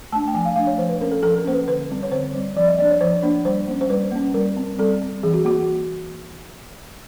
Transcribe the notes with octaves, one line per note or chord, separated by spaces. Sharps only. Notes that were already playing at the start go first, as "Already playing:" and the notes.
A3 D4 A5
G5
F3 G#5
F5
A3 D4 F5
C#5
F3 C5
B4
A#3 C#4 A#4
A4
F3 A4
A#4
A#3 C#4 C5
B4
D3 B4
G3 C4
C#5
D3 C5
G3 C4
F3 D5
D#5
A#3 D4 D5
C#5
F3 C5
A#3 D4
G3 C5
A#3 C#4
C5
G3 B4
A#3 C#4
G3 A#4
C4
G3 A4
C4
E3 G#4
F#4
A#3 F#4